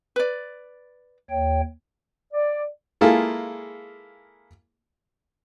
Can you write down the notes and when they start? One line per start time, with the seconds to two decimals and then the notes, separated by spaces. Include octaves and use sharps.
0.16 B4 D5
1.30 D#2 C#5 G5
2.33 D5
3.01 G#3 A#3 E4 F4 G#4 A4